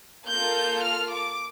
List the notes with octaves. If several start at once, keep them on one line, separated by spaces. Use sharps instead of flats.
A#3 F4 A4 G6
F6
D6